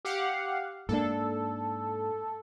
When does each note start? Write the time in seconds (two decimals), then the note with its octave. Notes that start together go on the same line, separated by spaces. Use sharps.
0.05 G4 F5 F#5
0.89 G#2 A#3 D4 A4